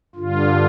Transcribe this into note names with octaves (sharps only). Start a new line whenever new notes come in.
G2 D3 F4